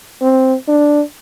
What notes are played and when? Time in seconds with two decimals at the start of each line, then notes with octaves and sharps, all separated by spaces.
0.21 C4
0.68 D4